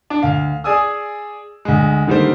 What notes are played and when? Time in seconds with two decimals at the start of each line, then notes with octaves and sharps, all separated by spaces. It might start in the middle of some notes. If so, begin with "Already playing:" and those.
0.10 D4
0.23 D2 F5
0.64 G#4 D5 G#5 D#6 E6
1.65 D2 G#3
2.07 D3 D#3 G3 A#3 C5